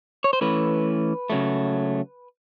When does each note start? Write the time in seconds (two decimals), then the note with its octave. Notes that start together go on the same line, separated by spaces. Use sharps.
0.24 C#5
0.33 C5
0.41 E3 A3 C#4 B4
1.30 C#3 F#3 A3